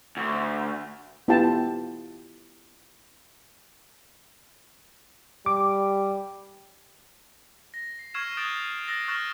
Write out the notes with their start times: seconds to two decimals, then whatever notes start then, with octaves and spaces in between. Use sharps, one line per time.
0.17 D2
1.28 B3 E4 F4 G4 G5 A5
5.46 G3 D6
7.74 A#6
7.99 C7
8.14 C#6 E6 F6 G#6 C7 E7
8.37 D#6 F#6 G6 A6 D7 E7
8.88 E6 A6 A#6 C7
9.08 C#6 F6 F#6 A6 A#6 E7